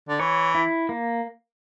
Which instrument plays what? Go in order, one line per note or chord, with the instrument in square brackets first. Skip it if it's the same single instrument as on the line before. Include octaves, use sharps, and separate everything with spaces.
[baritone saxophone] D3
[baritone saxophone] E3 [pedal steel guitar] C#5
[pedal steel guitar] E4
A#3